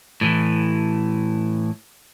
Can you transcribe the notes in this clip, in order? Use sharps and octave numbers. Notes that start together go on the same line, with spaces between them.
A2 E3